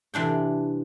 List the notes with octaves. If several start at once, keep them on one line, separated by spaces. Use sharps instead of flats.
C3 E3 D4 G5